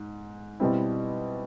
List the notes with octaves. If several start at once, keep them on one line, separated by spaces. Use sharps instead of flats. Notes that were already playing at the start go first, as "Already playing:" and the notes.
Already playing: G#2
B2 G3 C4 E4